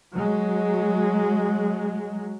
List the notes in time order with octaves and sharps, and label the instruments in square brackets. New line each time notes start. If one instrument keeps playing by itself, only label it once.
[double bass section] F#3 G#3